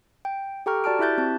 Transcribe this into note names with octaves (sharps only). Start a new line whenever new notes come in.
G5
G4 A4 G5 A#5 C#6 F6
F#4 D5 A5 F6 D7
E4 G4 E5 F#6 G6 A6
C4 A5